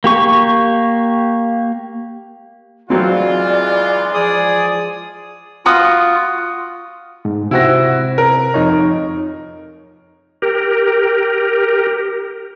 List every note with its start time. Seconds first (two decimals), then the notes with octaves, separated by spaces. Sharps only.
0.04 A#3 G4 C#6
2.90 E3 F#3 G#3 C4 F4 D5
4.14 F3 G#4 D5 D#6
5.66 F4 F#4 D#6
7.25 G#2
7.51 C3 C4 E4 F#4 A#6
8.18 A#4
8.54 F2 D#4 C#5
10.42 G4 A#4